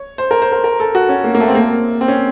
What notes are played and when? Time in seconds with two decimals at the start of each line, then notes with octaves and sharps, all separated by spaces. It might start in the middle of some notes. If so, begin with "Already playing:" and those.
Already playing: C#5
0.18 C5
0.31 A#4
0.42 C5
0.52 A#4
0.64 A#4
0.80 A4
0.95 F#4
1.09 C#4
1.24 A#3
1.35 A#3
1.40 A3
1.48 C4
1.55 A#3
2.01 C4
2.08 C#4